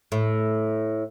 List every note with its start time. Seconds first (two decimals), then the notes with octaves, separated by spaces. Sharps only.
0.12 A2